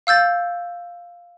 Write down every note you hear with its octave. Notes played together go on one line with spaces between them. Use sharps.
F5 E6 G6 A6